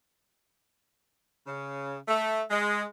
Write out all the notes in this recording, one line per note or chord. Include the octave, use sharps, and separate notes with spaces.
C#3
A3
G#3